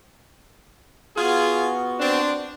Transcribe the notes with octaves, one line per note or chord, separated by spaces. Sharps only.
B3 F4 F#4 G#4
C4 D4